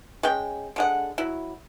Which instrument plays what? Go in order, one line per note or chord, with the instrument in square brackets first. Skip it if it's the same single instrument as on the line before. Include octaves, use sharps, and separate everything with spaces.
[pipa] G#3 C#4 G5
D3 G#3 F#5
F#3 E4